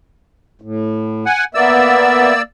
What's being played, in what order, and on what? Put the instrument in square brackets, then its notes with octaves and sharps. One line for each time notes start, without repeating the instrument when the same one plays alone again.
[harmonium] A2
[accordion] F#5 G#5
[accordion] A#3 D5 E6 [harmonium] B3 E5